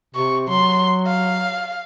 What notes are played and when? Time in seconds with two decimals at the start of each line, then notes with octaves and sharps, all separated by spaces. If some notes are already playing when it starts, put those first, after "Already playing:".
0.15 C3 C#6
0.49 F#3 C6
1.07 F5